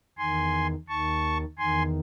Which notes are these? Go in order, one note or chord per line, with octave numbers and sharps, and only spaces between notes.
E2 D#3 G#5 C6
D#2 D#3 A5 C#6
E2 D#3 G#5 C6